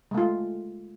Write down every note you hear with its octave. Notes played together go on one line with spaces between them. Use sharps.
G#3 A3 F4